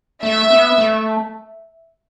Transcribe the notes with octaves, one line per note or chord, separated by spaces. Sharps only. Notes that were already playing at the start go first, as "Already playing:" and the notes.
A3 E5
B3
A3